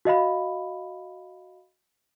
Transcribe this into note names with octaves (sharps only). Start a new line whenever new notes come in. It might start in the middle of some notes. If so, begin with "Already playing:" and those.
F#4 D#5 F5 B5